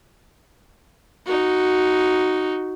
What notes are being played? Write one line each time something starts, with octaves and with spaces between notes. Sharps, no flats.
D#4 F#4